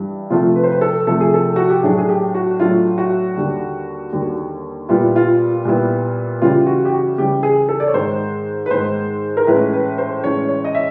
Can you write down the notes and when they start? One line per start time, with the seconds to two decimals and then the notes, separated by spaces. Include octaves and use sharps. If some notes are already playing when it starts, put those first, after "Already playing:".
Already playing: G2 E3 G3
0.30 C3 F3 A3 F4
0.56 B4
0.63 C5
0.70 B4
0.81 A4
1.07 C3 F3 A3 A4
1.20 G#4
1.34 A4
1.56 F#4
1.70 G4
1.83 A2 F#3 A3 D4 G#4
1.98 G#4
2.09 G4
2.34 F#4
2.60 A2 F#3 A3 D4 F4
2.98 F#4
3.36 D#2 D3 G3
4.12 D#2 D3 G3
4.89 A#2 G3 B3 E4 F4
5.16 F4
5.65 A#2 G3 B3 E4
6.42 C#3 E3 G3 F4
6.67 F#4
6.85 G4
6.92 F#4
7.18 C#3 E3 G3 G4
7.43 G#4
7.69 A4
7.80 D5
7.87 C#5
7.94 G#2 D#3 G#3 C5
8.66 B4
8.71 G#2 D#3 G#3 C5
9.37 A#4
9.47 A2 E3 G#3 C#4 B4
9.73 B4
9.98 C5
10.23 A2 E3 G#3 C#4 C#5
10.49 C#5
10.65 D#5
10.75 E5